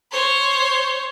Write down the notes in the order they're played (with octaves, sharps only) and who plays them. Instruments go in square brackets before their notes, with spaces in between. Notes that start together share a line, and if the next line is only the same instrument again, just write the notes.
[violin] C5 C#5